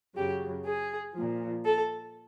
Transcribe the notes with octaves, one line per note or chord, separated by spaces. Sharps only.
F#2 C#3 F#3 G4
G#4
A#2 F3
A4